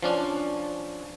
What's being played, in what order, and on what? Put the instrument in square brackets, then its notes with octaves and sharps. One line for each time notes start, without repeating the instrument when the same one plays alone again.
[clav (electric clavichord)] F3 C#4 D4